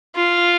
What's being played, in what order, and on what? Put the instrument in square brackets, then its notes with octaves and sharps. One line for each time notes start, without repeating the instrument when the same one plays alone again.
[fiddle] F4